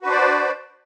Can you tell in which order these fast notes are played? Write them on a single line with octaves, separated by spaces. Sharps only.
F#4 B4 D4 C5 D5